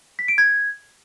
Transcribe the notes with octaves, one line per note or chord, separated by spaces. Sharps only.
B6
D7
G#6